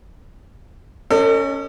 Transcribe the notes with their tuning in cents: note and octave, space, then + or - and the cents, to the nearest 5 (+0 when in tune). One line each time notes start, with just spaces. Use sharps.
C#4 +0 A4 +45 D#5 -25